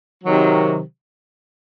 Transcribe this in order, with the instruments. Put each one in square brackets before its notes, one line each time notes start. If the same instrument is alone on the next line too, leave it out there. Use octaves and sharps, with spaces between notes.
[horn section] C3 D#3 F#3